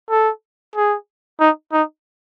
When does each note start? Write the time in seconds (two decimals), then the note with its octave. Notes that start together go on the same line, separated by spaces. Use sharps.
0.10 A4
0.76 G#4
1.40 D#4
1.73 D#4